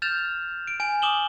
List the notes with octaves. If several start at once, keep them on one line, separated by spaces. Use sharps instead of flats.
F6 G6 A6 E7 F7
D7
G#5 D7
D6 D#6 E7 F#7 G7